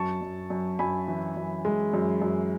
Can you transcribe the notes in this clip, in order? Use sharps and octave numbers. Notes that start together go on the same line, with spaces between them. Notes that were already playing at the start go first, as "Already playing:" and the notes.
Already playing: F#2 A5 C#6
F#2
F#2
F#2 G#5 B5
E3
F#2
G#3
F#2
F#2